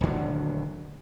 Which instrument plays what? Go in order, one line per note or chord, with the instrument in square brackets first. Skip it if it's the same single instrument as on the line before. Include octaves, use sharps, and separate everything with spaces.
[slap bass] D#1 D2 D3 F#3